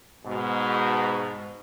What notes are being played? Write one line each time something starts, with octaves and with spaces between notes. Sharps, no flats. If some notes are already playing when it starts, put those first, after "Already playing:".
G#2 B2